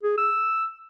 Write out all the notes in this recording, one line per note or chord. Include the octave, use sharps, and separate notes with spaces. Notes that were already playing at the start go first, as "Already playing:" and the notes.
G#4
E6